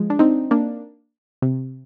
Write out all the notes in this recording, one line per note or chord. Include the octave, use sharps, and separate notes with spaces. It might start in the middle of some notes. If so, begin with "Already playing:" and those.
Already playing: F3 G#3
D4
C4 D#4
A#3 D4
C3